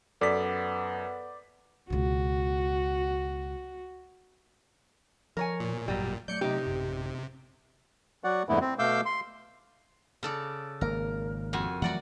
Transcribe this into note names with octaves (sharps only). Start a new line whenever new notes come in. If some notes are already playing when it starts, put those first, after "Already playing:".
F#2 B3 A4 D5 B6
C#2 B2 F#4
F3 A#4 C#5 G#5
A#2
G#1 F#2 F#3 G3
F#3 A3 D5 G6 C#7
C3 D#4 G4
A1 F#2
F#3 F#4 D5 F#5
F2 G#2 D3 A3 B3 E4
C4
B2 A3 F5 D6 E6 G6
C6
C#3 A4 D5
G#1 A#3 A#4
F2 F#4 G#5
E3 F#3 A3 F#4 D5 F#5